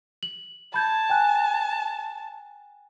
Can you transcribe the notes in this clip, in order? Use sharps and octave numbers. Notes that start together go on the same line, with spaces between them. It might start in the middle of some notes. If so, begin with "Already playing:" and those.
F#7
A5 B5 G6 G#6
G5 G#5 F#6